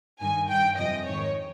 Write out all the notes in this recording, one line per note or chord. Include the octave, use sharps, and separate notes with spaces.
G2 D#3 G#5
G2 D#3 G5
F2 C3 F3 D#5
G#2 D#3 C#5